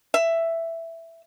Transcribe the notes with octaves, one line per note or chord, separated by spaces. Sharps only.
E5